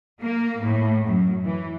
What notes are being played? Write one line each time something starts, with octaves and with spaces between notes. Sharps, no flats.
A#3
A2
F#2
E3